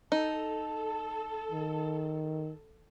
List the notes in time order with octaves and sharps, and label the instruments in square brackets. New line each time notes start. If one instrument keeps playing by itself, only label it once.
[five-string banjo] D#4 [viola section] A4 [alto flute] A5
[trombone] D#3